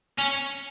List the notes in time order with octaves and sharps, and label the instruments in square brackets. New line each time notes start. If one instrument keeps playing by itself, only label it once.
[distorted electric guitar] C#4